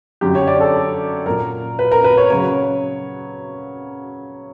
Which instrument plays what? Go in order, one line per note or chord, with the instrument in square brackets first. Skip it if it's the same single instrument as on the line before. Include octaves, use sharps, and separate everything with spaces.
[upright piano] F#2 D3 F#3 G4
C#5
D5
A4
A#2 F#3 A#4
B4
A#4
B4
C#5
C#3 F#3 C#5